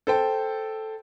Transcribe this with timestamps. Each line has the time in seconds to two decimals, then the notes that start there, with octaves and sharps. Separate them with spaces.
0.07 A4 C5 G5